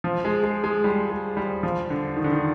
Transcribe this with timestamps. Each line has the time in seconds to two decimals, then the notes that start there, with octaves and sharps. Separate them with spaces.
0.04 F3
0.25 G#3
0.44 G#3
0.64 G#3
0.84 G3
1.10 G#3
1.37 G3
1.63 F3
1.90 D3
2.17 D#3
2.24 D3
2.32 D#3